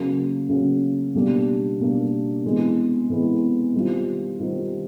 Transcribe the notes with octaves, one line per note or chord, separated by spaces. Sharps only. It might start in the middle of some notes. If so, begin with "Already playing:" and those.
Already playing: C#3 F#3 A#3 C#4
C#3 F#3 A#3 C#4
B2 G3 A#3 D4
B2 G3 A#3 D4
C3 E3 G#3 B3
C3 E3 G#3 B3
D#3 G3 C4 F4
D#3 G3 C4 F4